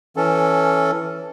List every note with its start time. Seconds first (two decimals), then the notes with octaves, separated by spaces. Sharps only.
0.17 E3 C#4 A4